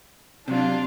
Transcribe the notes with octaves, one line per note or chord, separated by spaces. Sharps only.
C3 F#3 D4 F4